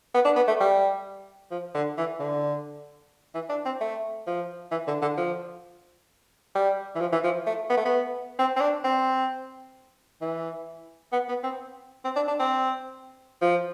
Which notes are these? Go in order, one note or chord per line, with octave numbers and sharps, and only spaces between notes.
B3
D4
B3
A3
G3
F3
D3
E3
D3
E3
D4
C4
A3
F3
E3
D3
D3
F3
G3
E3
F3
E3
F3
A3
B3
A3
B3
C4
C4
D4
C4
E3
B3
B3
C4
C4
D4
D4
C4
F3